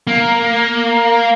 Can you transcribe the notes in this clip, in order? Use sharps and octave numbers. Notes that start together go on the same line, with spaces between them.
A#3